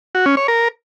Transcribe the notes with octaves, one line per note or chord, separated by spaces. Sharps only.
F#4
C#4
C#5
A#4